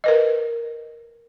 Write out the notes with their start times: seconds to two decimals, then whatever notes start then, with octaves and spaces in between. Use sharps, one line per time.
0.04 A#4 B4 D#5